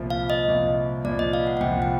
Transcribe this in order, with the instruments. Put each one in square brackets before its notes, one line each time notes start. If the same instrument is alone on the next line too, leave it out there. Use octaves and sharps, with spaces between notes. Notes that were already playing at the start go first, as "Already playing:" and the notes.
Already playing: [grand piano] C2 A#2 F3
[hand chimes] F5
D#5
[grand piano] C2 A#2 F3
[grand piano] C2 A#2 F3 [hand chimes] D5
[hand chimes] D#5
F5
F#5
F#5
[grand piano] C2 A#2 F3 [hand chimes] G5
[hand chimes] G5